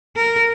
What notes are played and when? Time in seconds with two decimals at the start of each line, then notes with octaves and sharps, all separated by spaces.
0.16 A#4